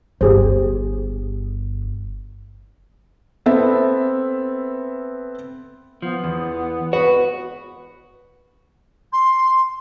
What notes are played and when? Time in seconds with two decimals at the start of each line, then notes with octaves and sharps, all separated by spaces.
0.21 G1 G4 G#4 C5
3.46 B3 C4 A4 E5
6.02 F3 B3
6.24 E2
6.93 F#4 B4
9.12 C6